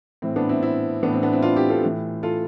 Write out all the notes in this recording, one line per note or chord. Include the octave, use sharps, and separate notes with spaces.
A2 E3 C4
B3 D4
C4 E4
C4 E4
A2 E3 B3 D4
C4
B3 D4
C4 E4
D4 F4
E4 G4
F4 A4
A2 E3
F4 A4